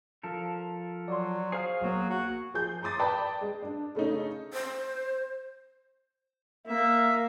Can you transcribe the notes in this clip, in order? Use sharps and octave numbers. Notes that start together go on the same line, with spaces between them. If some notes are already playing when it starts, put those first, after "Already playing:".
F3 A4 A#4
F#3 D5 C6
G#4 C5 F5 D#6 C7
B1 F#3 A#3
F#4
F3 G#4 G6
A#5 C6 D6 D#6 A6
B4 D5 G5 A5 B5
G#3
D4
C#3 A3 C#4 D#4
C5
A#3 E5